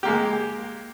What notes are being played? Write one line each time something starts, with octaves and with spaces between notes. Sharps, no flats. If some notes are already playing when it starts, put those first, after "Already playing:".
G#3 A#3 G4